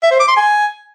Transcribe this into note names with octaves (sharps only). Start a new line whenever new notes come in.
E5
C5
D6
C6
G#5